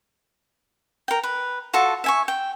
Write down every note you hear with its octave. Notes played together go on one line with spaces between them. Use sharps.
A#4 G5
B4
F4 F#4 A4 A5
E5 G#5 C#6
G5